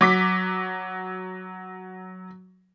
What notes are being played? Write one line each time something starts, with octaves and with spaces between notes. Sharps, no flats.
F#3 D6 B6